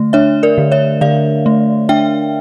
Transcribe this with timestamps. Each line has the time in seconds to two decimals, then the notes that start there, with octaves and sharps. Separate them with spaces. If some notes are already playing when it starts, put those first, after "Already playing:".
Already playing: D3 A3
0.13 D4 C#5 E5
0.43 A#4 D5
0.58 D3
0.72 C#5 E5
1.01 D3 D5 F5
1.46 A3
1.89 D4 E5 G5